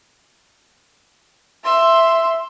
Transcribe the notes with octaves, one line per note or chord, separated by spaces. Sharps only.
E5 C6